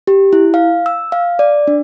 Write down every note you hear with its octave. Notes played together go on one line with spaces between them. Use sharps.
G4
E4
F5
E6
F5
D5
D4